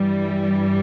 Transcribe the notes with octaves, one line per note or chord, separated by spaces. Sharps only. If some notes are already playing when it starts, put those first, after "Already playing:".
Already playing: G2 E3 G3